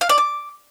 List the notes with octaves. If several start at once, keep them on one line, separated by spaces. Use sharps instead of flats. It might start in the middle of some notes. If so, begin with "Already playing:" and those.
F5
D5
D6